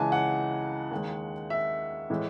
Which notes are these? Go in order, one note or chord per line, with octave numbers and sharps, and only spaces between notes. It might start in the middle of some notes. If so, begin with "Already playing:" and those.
Already playing: C#2 C#3 E3 G#3 G#5 A5
F#5
D#2 D#3 G#3
E5
A2 E3 G#3